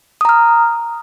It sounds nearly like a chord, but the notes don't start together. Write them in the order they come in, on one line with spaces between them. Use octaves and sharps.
D#6 A#5 F6